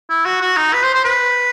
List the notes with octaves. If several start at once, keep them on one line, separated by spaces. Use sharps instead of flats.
E4
F#4
F#4
D#4
B4
C5
C5
B4